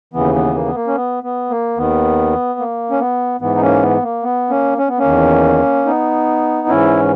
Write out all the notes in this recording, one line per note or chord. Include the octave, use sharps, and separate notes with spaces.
D#2 C#3 E3 B3
B3
A#3
B3
A#3
C#4
B3
B3
A#3
D#2 D#3 B3
A#3
C#4
B3
G#2 E3 B3
D#4
A#3 C#4
B3
A#3
B3
A#3 C#4
C#4
B3
A#3 C#4
E2 D#3
B3 D#4
G#2 E3 C#4 E4